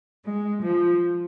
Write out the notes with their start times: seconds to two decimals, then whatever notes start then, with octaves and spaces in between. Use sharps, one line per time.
0.25 G#3
0.63 F3